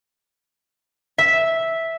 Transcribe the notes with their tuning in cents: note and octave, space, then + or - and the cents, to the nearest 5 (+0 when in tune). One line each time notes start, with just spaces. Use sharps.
E5 -5